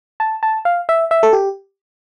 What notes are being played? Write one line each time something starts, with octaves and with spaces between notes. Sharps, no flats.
A5
A5
F5
E5
E5
A4
G4